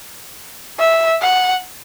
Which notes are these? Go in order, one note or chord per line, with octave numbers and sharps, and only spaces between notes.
E5
F#5